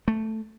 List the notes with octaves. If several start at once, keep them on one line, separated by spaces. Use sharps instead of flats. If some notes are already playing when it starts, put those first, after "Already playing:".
A3